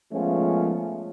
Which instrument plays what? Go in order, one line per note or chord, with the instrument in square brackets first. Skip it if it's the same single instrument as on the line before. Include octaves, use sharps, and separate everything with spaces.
[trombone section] F3 G#3 A3 B3 C#4 F4